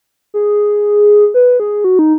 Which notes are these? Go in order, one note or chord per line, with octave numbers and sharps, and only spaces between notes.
G#4
B4
G#4
F#4
D#4